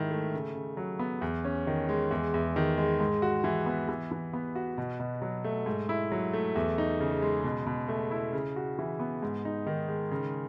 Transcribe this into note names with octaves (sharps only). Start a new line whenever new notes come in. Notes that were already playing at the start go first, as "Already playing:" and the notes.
Already playing: G#2 D#3 E4
A3
C#3
C#3
F#3
B3
E2
C#4
D#3
G#3
E2
E2
D#3
G#3
G#2
F#4
E3
B3
E3
E3
B3
F#4
B2
B2
F#3
A3
G#2
E4
F#3
A3
E2
D#4
C#3
G#3
B2
B2
A3
E4
C#3
F#4
E3
B3
G#2
D#4
D#3
G#3
C#3